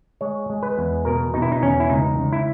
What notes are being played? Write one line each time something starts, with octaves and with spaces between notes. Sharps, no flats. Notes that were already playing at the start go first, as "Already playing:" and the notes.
G#3 C#5
G#3
B4
E2
B2 A#4
B2 D#4
E4
D#4
E2 C#4
E4
C#2 D#4
C#2
E4